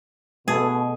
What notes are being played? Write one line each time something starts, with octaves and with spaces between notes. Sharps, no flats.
B2 A3 B3 G#4 A4